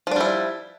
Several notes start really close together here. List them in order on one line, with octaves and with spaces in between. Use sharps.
F3 D4 G3 E4